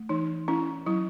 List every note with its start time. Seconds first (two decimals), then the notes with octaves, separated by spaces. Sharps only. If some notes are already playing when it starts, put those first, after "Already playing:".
Already playing: A3
0.09 E3 D#4
0.48 C#4 E4
0.86 F#3 E4